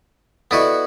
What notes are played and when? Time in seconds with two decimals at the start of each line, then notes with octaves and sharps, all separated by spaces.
0.51 B3 E4 F#4 A4 D5 D#5